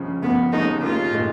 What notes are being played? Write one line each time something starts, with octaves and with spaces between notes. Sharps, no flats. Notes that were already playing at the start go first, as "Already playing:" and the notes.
Already playing: C#2 C#3 F3
C#2 C#3 F3 B3
D#2 C#3 G#3 D#4
D#2 C#3 G#3 F4
A#2 G#3 D#4